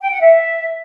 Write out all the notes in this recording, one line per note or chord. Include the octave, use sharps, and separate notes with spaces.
G5
F#5
E5